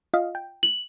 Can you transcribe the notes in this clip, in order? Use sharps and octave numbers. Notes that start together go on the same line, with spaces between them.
F4 D#5 F5
G5
F#7